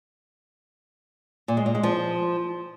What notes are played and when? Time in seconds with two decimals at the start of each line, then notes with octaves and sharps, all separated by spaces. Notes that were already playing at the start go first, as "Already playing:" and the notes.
1.48 A#2
1.57 G#3
1.66 A#2
1.75 G#3
1.83 F3